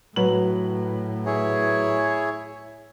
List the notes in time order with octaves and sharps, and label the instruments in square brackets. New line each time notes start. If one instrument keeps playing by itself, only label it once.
[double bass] A2 [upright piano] F#3 B4 F#7
[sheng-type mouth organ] E4 G#4 C#5